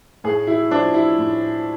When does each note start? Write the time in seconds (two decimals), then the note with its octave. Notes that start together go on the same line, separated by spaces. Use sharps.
0.24 A2 G#4
0.47 E4
0.71 F3 D4
0.94 E4
1.18 A2